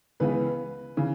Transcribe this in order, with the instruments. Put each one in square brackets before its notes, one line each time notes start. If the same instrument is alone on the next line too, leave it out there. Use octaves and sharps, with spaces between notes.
[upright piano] C#2 C#3 E3 B3 B4
C#3 E3